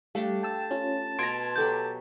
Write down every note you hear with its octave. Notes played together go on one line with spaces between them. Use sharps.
G3 A3 D4 G4 F5
G5 A5 E6
C#4 F4
B2 A#5 C6 G#6 A#6 D7
F#3 G4 A4 D6 G6